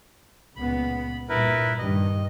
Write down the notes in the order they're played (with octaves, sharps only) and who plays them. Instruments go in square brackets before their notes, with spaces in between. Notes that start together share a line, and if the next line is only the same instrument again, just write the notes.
[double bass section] C#2 A#2 B3 [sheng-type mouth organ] B5
[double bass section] G2 A#2 [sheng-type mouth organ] E4 A#4 B4
[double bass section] G2 D#3 [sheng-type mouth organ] D#5